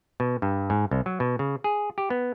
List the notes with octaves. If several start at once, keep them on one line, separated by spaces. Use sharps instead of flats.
B2
G2
G#2
C2
F#3
B2
C#3
G#4
G4
B3